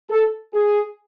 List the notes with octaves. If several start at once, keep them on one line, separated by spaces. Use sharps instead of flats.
A4
G#4